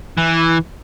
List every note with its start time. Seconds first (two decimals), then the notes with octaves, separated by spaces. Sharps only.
0.18 E3